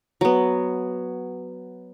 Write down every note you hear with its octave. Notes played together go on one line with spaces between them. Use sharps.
F#3 B3